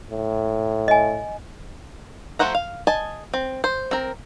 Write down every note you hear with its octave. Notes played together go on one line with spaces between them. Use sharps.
A2
D#5 G#5
F3 A3 C5 F#5 A#5
F5
D#5 G#5 A5
C4
C5
C4 A#4